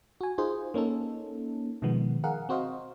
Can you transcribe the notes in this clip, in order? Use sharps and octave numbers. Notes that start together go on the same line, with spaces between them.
F#4 G#5
D#4 F4 G#4 C5
A#3 C#4 D#4 A4
B2 D#3 F3 G#3 B3
G#4 A#4 F5 F#5
C4 F#4 C5 D#5 F5